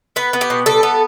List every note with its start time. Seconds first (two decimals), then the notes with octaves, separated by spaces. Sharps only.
0.16 B3 B4
0.33 B3
0.41 G4
0.50 B2
0.66 G3 A4
0.83 B3